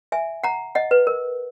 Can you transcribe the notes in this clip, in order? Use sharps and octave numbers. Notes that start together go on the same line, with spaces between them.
E5 G#5
F#5 A#5
D#5 F#5
B4
A#4